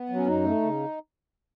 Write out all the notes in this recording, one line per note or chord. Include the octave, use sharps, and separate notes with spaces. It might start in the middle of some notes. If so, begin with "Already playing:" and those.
Already playing: B3
F#3
C#4
F#2 D#4
A3
C#3